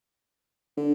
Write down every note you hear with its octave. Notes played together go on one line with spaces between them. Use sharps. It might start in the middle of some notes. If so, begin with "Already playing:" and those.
D3